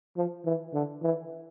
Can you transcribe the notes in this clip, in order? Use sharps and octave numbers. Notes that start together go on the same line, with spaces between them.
F3
E3
D3
E3